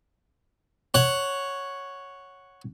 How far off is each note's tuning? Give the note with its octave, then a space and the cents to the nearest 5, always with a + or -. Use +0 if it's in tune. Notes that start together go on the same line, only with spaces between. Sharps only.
C#5 +0 F#5 +0